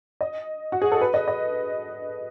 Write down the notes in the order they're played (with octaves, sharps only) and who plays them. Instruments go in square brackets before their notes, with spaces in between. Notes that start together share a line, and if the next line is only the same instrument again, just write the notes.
[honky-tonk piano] D#5
F#4
G#4
A4
B4
D#5
D#5